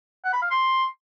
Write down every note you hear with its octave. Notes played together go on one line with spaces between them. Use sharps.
F#5
B5
F5
C6